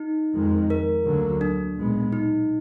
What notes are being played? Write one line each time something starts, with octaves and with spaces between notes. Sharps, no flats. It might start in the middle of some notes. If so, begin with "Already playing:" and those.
Already playing: D#4
F2 D#3 G#3
A#4
D2 D3 F#3 A#3
D4
B1 A#2 G#3 B3
D#4